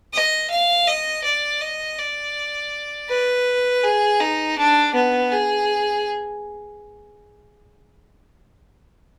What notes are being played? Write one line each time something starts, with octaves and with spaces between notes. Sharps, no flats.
D#5
F5
D#5
D5
D#5
D5
B4
G#4
D#4
D4
B3
G#4